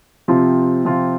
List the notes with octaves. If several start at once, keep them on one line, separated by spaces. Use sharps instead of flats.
C3 F3 C4 F4
C3 F3 C4 F4